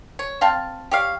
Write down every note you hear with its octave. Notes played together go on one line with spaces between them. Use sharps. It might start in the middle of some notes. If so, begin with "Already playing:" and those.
C#5
C4 F5 G5 A5
G4 C#5 F5